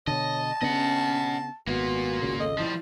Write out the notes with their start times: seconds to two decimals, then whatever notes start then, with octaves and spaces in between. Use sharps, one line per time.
0.07 B2 D3 C#5 D#5 A5
0.62 C#3 B3 C#4 D4 D#5 F#5
1.67 G#1 A#3 B3 F4 F#4
2.22 G#1 C#2 C#3
2.40 A4 D#5
2.58 F3 G3 E4